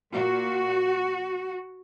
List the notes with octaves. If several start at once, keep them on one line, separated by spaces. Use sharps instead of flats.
A#2 A#3 F#4